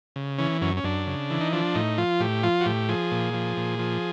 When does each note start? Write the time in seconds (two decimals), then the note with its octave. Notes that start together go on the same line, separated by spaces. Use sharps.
0.16 C#3
0.38 E3 C#4
0.61 F#2 C#4
0.77 C#4
0.84 F#2 D4
1.07 C#3
1.30 E3
1.40 D#4
1.53 F3 D4
1.75 A2 D#4
1.98 F3 F4
2.20 A2 G4
2.43 F3 F4
2.61 F#4
2.66 A2 G4
2.89 F3 G#4
3.12 A#2
3.34 F3
3.57 A#2
3.79 F3